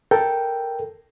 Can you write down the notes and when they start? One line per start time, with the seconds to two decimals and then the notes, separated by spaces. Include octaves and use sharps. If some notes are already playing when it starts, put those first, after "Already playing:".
0.11 A4 A#4 G5